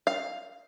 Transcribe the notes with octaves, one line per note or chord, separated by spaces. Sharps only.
F5